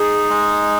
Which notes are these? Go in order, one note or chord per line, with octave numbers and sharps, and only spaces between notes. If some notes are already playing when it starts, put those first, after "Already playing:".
Already playing: D#4 G#4
G#3